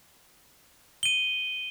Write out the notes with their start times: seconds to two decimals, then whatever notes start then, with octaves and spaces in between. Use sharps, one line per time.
1.03 D#7 G7